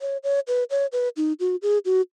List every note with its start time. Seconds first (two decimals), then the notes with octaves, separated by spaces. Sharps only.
0.01 C#5
0.24 C#5
0.48 B4
0.70 C#5
0.93 B4
1.17 D#4
1.40 F#4
1.62 G#4
1.85 F#4